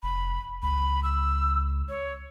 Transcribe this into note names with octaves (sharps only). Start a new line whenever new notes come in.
F1 B5
C#2 B5
E6
C#5